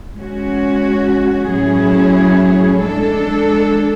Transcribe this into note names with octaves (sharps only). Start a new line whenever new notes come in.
G#3 C#4 F#4
A2 F#3 C#4 E4 G#4
G#3 D4 A4